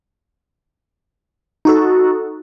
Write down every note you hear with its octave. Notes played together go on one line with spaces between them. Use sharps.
D#4 F#4 A4